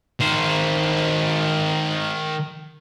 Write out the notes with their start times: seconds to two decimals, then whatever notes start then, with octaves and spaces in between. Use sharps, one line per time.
0.20 D#3 C5